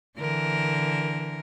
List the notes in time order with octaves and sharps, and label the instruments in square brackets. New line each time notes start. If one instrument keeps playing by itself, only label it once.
[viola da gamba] D3 E3 A#4